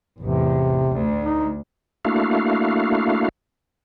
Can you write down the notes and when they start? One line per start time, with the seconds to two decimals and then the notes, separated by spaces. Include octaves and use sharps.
0.21 A1 E2 C3
0.92 D2
1.25 D#4
2.05 A3 A#3 D4 E4 F#4 F5